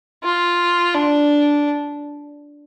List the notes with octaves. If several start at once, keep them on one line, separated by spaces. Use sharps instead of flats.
F4
D4